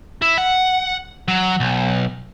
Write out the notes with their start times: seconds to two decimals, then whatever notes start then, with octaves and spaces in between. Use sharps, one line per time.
0.22 E4
0.38 F#5
1.28 F#3
1.60 B1